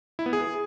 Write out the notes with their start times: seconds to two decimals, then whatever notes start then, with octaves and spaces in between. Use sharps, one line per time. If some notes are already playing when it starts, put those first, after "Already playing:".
0.19 E4
0.26 B3
0.33 G#4